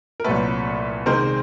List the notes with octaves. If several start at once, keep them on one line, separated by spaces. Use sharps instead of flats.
A#4
C2 A#2 F#3 A3 A4 B4
C3 D#3 G#3 C4 A#4 C5